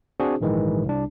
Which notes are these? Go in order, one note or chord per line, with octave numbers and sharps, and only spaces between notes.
C4 D4 F#4 G#4 C5
A#1 G#2 D#3 E3 G#3
C2 D4